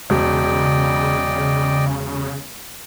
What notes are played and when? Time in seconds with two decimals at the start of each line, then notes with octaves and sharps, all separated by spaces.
0.10 E1 C#3 D5 D#5 G5